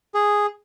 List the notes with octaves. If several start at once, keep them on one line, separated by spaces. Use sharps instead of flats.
G#4